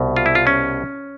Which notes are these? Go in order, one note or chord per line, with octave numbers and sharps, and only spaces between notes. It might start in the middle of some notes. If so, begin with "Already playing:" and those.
Already playing: C2 B2
F4
E4
F4
C#4